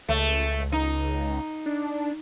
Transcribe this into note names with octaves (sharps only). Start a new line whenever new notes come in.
C#2 A3
D#4
D4